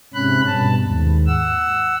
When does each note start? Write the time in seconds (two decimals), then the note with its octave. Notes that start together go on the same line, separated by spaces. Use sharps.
0.14 G#2 C3 C#4 B5 F#6
0.46 G2 B2 A5
0.82 D#2 G#2
1.27 F#5 E6